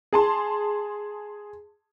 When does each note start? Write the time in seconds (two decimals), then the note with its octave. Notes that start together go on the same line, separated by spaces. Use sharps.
0.13 G#4 A5 C6